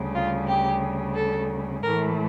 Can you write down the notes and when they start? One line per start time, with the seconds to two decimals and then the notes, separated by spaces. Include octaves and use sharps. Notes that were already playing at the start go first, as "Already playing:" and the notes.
Already playing: D2 C#3 G3
0.14 F4
0.47 G4
1.15 A4
1.83 A2 E3 A3 A#4